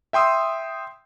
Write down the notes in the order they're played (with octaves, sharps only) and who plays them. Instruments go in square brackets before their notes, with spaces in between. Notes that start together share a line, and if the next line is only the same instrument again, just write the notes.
[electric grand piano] E5 G5 C6 D#6 E6